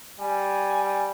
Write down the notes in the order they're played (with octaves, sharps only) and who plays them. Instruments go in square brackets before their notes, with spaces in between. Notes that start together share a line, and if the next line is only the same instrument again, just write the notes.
[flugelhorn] G3 [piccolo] G#5